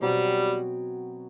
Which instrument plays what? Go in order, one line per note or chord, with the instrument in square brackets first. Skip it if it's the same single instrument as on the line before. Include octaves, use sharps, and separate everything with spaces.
[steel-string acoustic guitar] B2 F#3 C4 F#4 [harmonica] G3